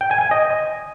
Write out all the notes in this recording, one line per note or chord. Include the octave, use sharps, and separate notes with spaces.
G5
G#5
G#5
D#5